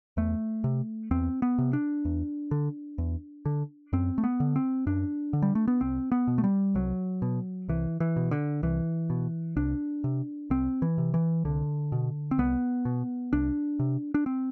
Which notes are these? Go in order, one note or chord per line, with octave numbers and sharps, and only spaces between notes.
E2 A3
C3
E2 C4
B3
C3
D4
E2
D3
E2
D3
F#2 C4
A3
B3
D3
C4
F#2 D4
D3
G3
A3
B3
C2 C4
B3
B2
A3
G3
C2 F#3
B2
C2 E3
E3
B2
D3
C2 E3
B2
C2 D4
C3
C2 C4
E3
C3
E3
C2 D3
B2
C4
C2 B3
B2
C2 D4
C3
D4
C4